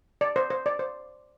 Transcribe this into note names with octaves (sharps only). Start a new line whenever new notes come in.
D5
C5
C5
D5
C5